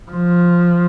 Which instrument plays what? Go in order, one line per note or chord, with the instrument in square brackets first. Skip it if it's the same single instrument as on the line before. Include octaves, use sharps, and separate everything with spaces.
[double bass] F3